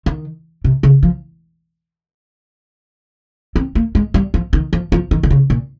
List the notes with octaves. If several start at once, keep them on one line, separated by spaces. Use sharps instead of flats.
D#3
C3
C#3
F3
C4
A#3
G#3
G3
F3
D#3
F3
F3
D#3
D#3
C#3
A#2